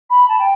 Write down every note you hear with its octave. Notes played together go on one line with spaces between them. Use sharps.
B5
A5
G5